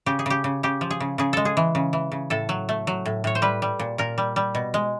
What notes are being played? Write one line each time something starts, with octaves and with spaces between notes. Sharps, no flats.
C#3 G4
G#4
C#3 G4
C#3
C#3 G4
F3
G#4
C#3
C#3 G#4
G#3 A4
G#4
E3
C#3
E3
C#3
A2 A4
F#3
A3
F#3
A2
A2 C#5
C5
G3 B4
G3
A#2
A#2 A#4
G3
G3
B2
G#3